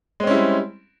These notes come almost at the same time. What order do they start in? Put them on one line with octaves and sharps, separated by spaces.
G#3 C4 C#4 E4 G3